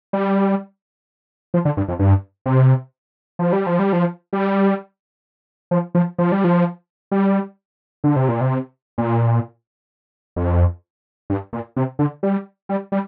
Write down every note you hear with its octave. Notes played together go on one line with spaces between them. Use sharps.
G3
F3
D3
G2
F2
G2
C3
F3
G3
F3
G3
F3
G3
F3
F3
F3
G3
F3
G3
D3
C3
A#2
C3
A#2
F2
G2
A#2
C3
D3
G3
G3
G3